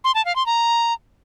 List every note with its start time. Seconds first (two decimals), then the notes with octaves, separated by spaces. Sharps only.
0.04 C6
0.15 A5
0.25 F5
0.36 C6
0.46 A#5